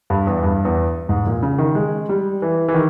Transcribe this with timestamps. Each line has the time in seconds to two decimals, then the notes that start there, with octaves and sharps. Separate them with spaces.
0.10 G2
0.27 E2
0.43 G2
0.65 E2
1.09 G#2
1.26 A#2
1.43 C#3
1.58 D#3
1.75 G#3
2.09 G3
2.42 E3
2.68 E3
2.74 D#3